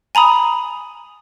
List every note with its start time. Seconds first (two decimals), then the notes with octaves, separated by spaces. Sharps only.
0.15 G#5 A#5 B5 D#6